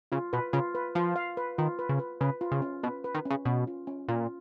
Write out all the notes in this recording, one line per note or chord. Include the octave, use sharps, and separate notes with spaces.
C#3 F4
B2 B4
C#3 F4
B4
F3 F4
F5
B4
D#3 F4
B4
C#3
B4
C#3 B4
F4
C#3
C#4
B2 B4
B4
D#3
C#3 C#4
B2 C#4
F4
C#4
A#2 F4